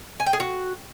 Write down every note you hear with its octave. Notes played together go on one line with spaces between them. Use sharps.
G#5
G5
G#4
F#4